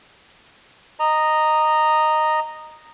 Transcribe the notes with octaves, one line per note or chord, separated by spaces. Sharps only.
D#5 A#5